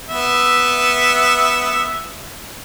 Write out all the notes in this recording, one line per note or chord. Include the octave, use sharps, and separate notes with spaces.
B3 E5